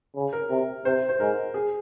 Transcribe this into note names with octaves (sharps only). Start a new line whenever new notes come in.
C#3
A#4
C3
C3 C5
C5
G#2 A#4
G#4